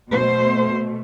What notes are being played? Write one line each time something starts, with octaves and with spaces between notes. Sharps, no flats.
B2 A3 C5